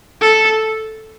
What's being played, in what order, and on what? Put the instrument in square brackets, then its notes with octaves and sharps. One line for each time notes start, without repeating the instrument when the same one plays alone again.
[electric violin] A4